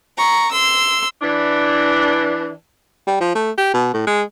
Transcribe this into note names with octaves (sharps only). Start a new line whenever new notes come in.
A#5 C#6
C6 E6
E3 D4
G3
F3
A3
G4
B2
A2
G#3